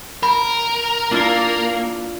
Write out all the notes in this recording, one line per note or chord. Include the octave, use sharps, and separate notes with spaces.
A#4 B5
A#3 D4 E4 F4